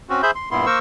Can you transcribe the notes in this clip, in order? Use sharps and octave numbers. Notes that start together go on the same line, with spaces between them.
C4 C#4 F#4
G#4 C5 E5 B5 G6
C6
G2 A#2 B3 E4 C6
A#3 A#4 C5 C#6 E6